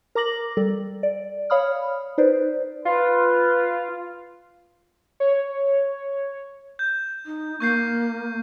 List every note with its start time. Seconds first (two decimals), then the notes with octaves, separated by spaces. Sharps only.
0.15 A#4 A#5 D6 A#6 F#7
0.57 G3 A4
1.03 D5
1.50 C#5 F5 B5 D#6 F6
2.18 D#4 B4 C5 D5
2.85 F4 B4
5.20 C#5
6.79 G6
7.26 D#4
7.60 A#3 C#6 G6 C7